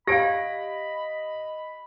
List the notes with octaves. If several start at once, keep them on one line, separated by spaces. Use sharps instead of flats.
G4 D5 D#5 F5 B5 A#6 D7